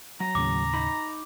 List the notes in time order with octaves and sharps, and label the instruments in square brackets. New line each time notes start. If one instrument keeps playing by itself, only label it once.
[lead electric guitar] F#3 [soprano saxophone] A#5
[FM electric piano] D#2 A2 C#3 [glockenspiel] D6
[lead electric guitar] D#4 B5